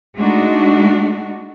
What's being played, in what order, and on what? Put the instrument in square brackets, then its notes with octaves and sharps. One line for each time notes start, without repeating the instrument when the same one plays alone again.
[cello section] G#3 A3 D4 D#4 F#4